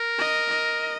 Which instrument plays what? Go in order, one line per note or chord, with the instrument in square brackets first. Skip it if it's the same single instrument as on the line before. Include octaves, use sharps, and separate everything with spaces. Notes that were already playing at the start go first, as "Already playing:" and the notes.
Already playing: [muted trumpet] A#4
[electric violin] D#5
D#5